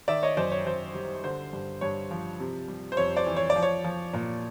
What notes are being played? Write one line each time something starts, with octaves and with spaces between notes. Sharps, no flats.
D#3 D5 E5
C#5 D#5
F#2 C5 D5
C#5
F#2 C5
G3
D3 C5
G2
G2 C#5
F3
C3
G3
C5
F2 C#5
C5 D5
E3
C#5
D5
F3
C#5
F3
A#2